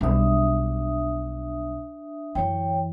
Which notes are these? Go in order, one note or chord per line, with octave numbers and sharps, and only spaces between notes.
B1 G3 D4 E5 D#6
F#2 E3 C#5 G5